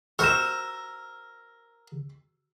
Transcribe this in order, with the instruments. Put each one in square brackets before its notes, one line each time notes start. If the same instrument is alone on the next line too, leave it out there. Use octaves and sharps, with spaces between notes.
[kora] F#4 C5 [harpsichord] A#4 [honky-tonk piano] E6 E7